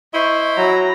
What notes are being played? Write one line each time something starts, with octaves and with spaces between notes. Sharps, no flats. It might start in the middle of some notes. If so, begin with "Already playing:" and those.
E4 C5 D#5 C#6
F#3 A#5 B5